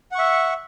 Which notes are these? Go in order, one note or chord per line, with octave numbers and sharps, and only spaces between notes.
E5 F#5 C#6